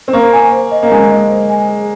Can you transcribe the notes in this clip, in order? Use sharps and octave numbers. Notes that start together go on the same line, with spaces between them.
C4
A#3 C#6
G#5
C5
D#5
A#3
G#3 G#5
D#5
C5
G#5
G#4